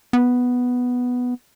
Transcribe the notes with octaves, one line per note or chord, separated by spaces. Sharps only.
B3